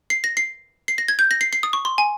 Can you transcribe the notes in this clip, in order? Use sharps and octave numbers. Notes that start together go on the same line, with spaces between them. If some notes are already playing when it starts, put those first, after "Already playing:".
C7
A#6
C7
C7
A#6
G#6
G6
A#6
C7
C7
D#6
C#6
C6
G#5